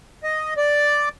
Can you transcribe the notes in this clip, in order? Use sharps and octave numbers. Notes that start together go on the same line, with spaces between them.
D#5
D5